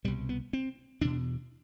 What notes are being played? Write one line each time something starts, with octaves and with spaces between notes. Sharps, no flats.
C2 B2 G3
B3
C4
E2 B2 D4